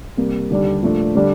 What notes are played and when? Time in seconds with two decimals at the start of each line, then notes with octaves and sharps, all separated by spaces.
0.17 C3 G3 A#3
0.50 D#2 D3 G3 D4
0.83 A#2 F3 A3 D4
1.15 D3 G3 D4